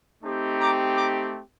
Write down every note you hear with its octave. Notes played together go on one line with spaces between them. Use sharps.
A3 C4 D#4 G4
A#5 D6
A#5 D6